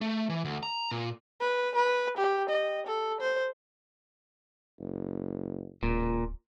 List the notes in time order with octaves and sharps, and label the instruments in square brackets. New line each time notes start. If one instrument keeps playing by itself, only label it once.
[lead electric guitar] A3
E3
D2
A#5
A#2
[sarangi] B4
B4
G4
D#5
A4
C5
[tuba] F#1
[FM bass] D1 [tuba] C#2 [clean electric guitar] A#2